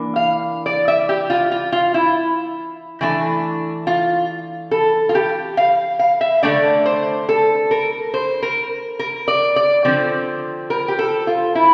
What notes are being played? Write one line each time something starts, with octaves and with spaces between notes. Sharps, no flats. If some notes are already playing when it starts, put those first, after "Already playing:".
Already playing: E3 A#3 D4
F5
D5
E5
G4
F4
F4
F4
E4
E3 A3 D4
F4
A4
F4
G4
F5
F5
E5
D3 A3 D4 D5
C5
A4
A#4
C5
A#4
A#4
D5
D5
D3 F3 C4
A#4
G4
A4
F4
E4